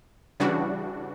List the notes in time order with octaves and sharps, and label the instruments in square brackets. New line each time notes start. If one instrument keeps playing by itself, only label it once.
[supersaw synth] C#3 E3 G3 D4 F#4